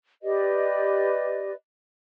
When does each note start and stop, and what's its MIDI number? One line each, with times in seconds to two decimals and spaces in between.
0.23 1.53 67
0.23 1.53 71
0.23 1.53 74
0.23 1.53 75